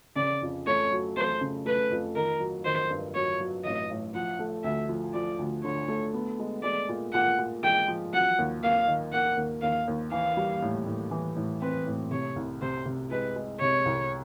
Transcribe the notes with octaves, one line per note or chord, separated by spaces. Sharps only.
C#3 D5
F2
A3 C#5
F#3
A3 C5
C#3
A3 B4
F2
D#3 A#4
F#3
D#3 C5
G2
F#3 C#5
F#3
A1 D#5
A1
F3 F#5
A3
D2 E5
F3
F3 D5
D2
D3 C#5
A3
B3
G#3
G#3 D5
A#2
A#2 F#5
A#2
G#3 G5
F3
F#3 F#5
D#2
A#3 F5
D#3
A#3 F#5
D#2
D#2 F5
D#2
E3 F5
G3
A2
A2
E3
A2
C4 B4
A2
C3 C#5
C2
C3 C5
C3
G#3 B4
G#3
C3 C#5
C2